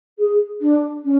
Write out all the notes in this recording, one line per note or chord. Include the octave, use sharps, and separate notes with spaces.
G#4
D4
C#4